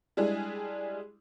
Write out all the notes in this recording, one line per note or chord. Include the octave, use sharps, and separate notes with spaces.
G3 G#3 D4 E4 G#4